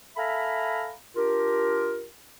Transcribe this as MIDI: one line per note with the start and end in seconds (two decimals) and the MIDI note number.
0.17 0.92 69
0.17 0.92 76
0.17 0.92 77
0.17 0.92 80
0.17 0.92 82
0.17 0.92 83
1.16 2.06 62
1.16 2.06 65
1.16 2.06 67
1.16 2.06 70